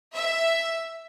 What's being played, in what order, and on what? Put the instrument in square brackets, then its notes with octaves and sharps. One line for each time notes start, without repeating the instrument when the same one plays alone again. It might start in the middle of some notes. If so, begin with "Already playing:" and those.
[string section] E5